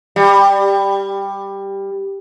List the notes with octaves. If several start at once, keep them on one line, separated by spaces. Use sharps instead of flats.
G3